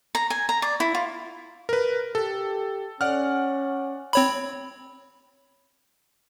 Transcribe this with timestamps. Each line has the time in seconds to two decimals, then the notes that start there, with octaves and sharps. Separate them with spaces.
0.15 A#5
0.30 G#5
0.49 A#5
0.62 D5
0.80 E4
0.95 F4
1.69 A#4 B4
2.15 G4 A4
3.01 C#4 D5 F#5 F6
4.13 C4 C#5 B5